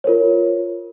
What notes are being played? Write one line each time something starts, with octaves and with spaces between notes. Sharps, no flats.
F4 A#4 C5 C#5